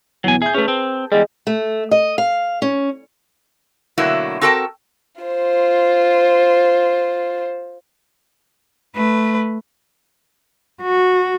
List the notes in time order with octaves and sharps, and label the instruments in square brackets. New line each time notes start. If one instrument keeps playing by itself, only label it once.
[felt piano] E2 B2 [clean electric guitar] F#3 G#5
[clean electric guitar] G#4 [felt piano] E5 G6
[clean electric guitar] A3 C#4 [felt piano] G#4 B4 A5
[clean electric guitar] C4
[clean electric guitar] E2 G3 [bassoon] G#3 [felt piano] D#5
[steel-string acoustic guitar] A3
D#5
F5
C#4
[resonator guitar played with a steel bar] B2 D3 F#3 A3 A#3 E4
C4 F#4 A4 A#4 G5 A5
[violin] F4 C5
[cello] A3 B4
F#4